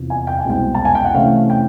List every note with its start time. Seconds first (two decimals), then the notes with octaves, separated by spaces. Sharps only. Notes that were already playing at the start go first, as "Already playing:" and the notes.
Already playing: E2 C3 F3
0.10 G#5
0.27 G5
0.39 G#5
0.45 C2 B2 G#3 C4 G5
0.75 A5
0.85 G#5
0.95 G5
1.04 F#5
1.15 C3 E3 A3 C#4 E4 F5
1.50 G5